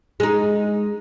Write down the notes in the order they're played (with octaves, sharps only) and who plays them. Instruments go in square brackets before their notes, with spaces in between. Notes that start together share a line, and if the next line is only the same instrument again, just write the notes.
[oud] G#3 D#4